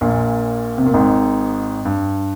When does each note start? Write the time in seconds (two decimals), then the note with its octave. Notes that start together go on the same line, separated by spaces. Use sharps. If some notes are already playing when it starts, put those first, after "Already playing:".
0.01 A#1 A#2
0.78 C3
0.86 A#2
0.94 G#1 G#2
1.85 G2